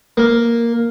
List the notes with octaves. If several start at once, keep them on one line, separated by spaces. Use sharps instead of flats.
A#3